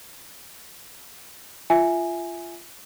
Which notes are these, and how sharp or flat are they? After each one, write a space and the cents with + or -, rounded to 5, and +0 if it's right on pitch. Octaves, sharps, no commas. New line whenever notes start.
F4 -20 E5 +0 G#5 +0